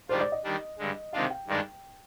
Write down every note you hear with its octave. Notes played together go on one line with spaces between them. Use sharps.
G#2 D#3 G3 D4 F4 C5
D5
D#5
D#3 G3 D4
G2 D3 G#3
C3 D#3 G#3 D4 F4 F5
G5
G2 D#3 G#3 D4